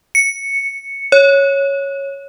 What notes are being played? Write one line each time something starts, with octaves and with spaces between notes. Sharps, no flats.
C#7
C#5